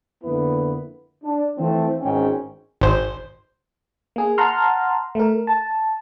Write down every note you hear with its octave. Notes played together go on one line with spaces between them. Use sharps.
F2 D3 A#3 B3 E4 B4
D4
E3 F3 A3 C4
G#1 E2 G#2 C#4 C#5 G5
G#1 C5
A#3 G#4
F#5 A5 A#5 C6 F6
A3 A#4
A5